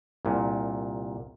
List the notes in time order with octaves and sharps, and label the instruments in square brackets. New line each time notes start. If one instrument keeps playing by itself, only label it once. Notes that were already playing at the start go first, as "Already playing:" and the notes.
[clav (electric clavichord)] C2 A#2